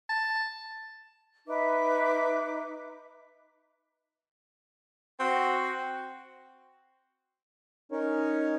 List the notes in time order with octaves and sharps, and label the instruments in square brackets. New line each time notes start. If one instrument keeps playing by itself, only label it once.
[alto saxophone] A5
[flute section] D#4 B4 E5 D6
[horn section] C4 F#4
[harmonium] C#4 D#4 A#4 C#5